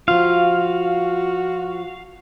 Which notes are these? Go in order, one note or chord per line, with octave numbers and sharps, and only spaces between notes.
F3 F4 F#4 F5